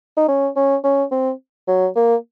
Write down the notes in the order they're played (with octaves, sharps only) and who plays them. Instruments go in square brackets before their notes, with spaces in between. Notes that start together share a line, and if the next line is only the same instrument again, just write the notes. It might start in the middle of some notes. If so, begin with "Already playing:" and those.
[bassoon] D#4
C#4
C#4
C#4
C4
F#3
A#3